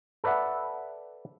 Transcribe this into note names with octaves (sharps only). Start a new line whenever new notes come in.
A4 B4 D5 E5 F#5